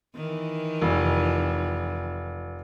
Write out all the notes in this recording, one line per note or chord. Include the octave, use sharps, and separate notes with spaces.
D#3 E3
F1